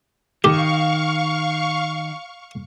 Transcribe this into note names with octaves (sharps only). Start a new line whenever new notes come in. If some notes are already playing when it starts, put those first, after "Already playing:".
D#3 G4 F5 C#6